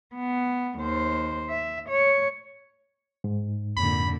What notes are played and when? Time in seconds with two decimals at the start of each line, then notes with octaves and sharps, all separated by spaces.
0.15 B3
0.79 D#2 C5
1.49 E5
1.89 C#5
3.24 G#2
3.77 F2 A#2 D3 B5